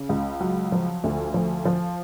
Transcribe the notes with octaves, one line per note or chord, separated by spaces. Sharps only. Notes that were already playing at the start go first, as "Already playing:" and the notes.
Already playing: C#3
C#2
F#3
F3
D2
F3
F3